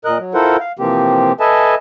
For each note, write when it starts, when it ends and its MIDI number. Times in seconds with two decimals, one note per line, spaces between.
0.05 0.18 46
0.05 0.18 70
0.05 0.18 75
0.05 0.18 90
0.19 0.33 54
0.34 0.57 64
0.34 0.57 65
0.34 0.57 69
0.34 0.57 70
0.34 0.57 72
0.34 0.57 78
0.60 0.72 77
0.79 1.32 48
0.79 1.32 52
0.79 1.32 53
0.79 1.32 58
0.79 1.32 60
0.79 1.32 67
1.40 1.75 69
1.40 1.75 71
1.40 1.75 75
1.40 1.75 76
1.40 1.75 80
1.40 1.75 81